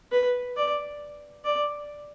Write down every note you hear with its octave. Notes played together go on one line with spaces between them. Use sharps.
B4
D5
D5